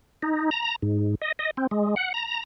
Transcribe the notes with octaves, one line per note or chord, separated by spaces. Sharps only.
D#4
A#5
G#2
D#5
D#5
C4
G#3
F#5
A#5